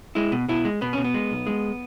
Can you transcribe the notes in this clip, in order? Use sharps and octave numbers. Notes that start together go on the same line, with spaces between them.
G#3 E4
B2
B2 E4
G#3
B2 B3
B2 C#4
B3
G#3
B1
G#3